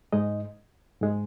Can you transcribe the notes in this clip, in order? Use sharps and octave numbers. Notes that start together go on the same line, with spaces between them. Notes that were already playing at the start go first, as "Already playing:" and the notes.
G#2 G#3 D#4 D#5
G#2 G#3